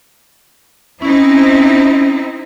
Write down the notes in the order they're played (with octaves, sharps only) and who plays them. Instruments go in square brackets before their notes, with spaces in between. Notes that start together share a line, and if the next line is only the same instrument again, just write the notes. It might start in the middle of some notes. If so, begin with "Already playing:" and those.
[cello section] C4 D#4 E4 [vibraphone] C#4